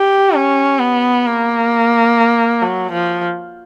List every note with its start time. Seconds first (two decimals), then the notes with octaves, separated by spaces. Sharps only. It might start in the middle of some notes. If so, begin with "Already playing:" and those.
Already playing: G4
0.35 C#4
0.79 B3
1.25 A#3
2.62 F#3
2.92 F3